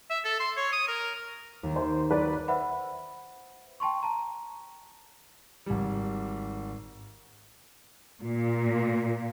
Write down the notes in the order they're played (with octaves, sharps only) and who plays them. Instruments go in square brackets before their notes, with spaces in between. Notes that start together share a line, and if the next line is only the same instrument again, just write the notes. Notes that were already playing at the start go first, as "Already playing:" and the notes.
[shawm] E5
A4
C6
C#5
D#6
A#4
[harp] D#2
[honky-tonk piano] C5
[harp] F#3 [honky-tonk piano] B4 D5
[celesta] B4 C5 E5 F#5 B5
G5 A5 C6 C#6
A5 A#5
[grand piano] G#1 G3
[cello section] A#2